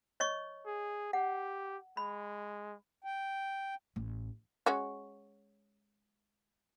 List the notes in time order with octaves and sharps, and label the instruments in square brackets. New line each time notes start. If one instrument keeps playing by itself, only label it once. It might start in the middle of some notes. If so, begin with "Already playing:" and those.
[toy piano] C#5 D#5 C#6
[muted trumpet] G#4
[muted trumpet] G4 [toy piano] F#5
[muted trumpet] G#3 [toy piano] B5
[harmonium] G5
[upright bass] A1
[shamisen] G#3 C#4 F#4